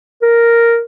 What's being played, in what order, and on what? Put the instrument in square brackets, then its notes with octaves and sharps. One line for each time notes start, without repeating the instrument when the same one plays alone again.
[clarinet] A#4